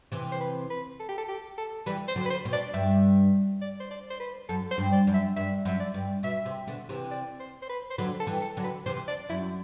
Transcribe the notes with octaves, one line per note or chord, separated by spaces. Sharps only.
C3 E3
C5
B4
B4
A4
G4
A4
G4
A4
E3 G3 B4
C5
D3 F#3
B4
C5
B2
D5
G2 E5
D5
C5
D5
C5
B4
F#2 A4
C5
G2
D5
F#2
E5
G2 E5
F#2 E5
D5
G2
B2 E5
C3
B2 D3
C3 E3
D5
C5
C5
B4
C5
D3 F#3 B4
A4
E3 G3
A4
D3 F#3
B4
C3 E3 C5
D5
F#2 E4